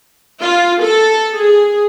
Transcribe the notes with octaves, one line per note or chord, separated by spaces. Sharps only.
F4
A4
G#4